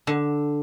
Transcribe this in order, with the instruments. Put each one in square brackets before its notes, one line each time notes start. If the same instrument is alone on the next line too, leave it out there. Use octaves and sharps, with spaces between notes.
[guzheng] D3